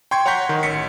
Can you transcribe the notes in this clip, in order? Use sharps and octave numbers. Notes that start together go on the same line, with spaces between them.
G5 C6 C#6 G#6
C#5 F#5 A#5 C6 G6 B6
D#3
A1 B6 C#7